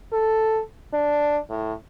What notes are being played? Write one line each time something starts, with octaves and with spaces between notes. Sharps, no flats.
A4
D4
A2